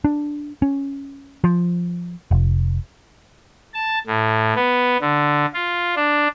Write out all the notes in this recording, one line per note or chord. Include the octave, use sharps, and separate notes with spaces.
D4
C#4
F3
F1
A5
A2
B3
D3
F4
D4